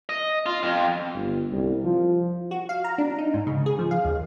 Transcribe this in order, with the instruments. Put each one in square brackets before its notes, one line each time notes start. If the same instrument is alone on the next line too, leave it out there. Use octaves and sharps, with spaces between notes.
[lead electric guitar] D#5
F4
F2
[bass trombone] G1
C2
F3
[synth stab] F#4
F5
A#5
D4
D#4
G#2
C#3
G#4
F3
F5
D#2